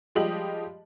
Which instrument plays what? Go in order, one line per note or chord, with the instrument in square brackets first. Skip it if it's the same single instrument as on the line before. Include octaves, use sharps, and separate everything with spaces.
[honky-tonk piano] F3 G3 G#3 G4 D#5 F#7